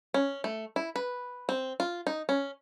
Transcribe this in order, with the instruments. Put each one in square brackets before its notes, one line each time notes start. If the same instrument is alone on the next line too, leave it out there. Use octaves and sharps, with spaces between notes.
[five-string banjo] C#4
A3
E4
B4
C4
F4
D#4
C#4